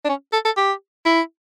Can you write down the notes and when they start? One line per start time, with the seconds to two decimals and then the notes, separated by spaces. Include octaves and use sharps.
0.05 D4
0.09 C#4
0.33 A4
0.45 A4
0.57 G4
1.06 E4